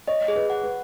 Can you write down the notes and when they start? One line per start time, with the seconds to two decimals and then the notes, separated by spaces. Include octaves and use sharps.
0.08 C#5 D#5
0.28 G#4
0.36 B4
0.50 F#5
0.64 B4